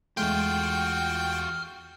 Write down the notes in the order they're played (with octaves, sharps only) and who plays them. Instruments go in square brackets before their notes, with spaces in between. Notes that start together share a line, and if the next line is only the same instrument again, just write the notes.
[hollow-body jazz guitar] E2 G#3 A3 [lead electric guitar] F4 F#4 [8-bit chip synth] G5 [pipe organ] F6